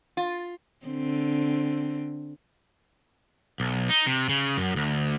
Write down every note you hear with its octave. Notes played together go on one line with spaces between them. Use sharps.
F4
D3 C4
B1
D#4
C3
C#3
F#2
D2